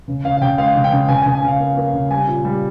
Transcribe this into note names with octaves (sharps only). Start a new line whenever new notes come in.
C#3
C#3 F5
F5
C#3 G5
G#3 F5
C#3
G5
C#3
C#3 G#5
G#5
C#3
G#5
C#3 F5
A#3
A#3
C#3
G3 G#5
A#2
G3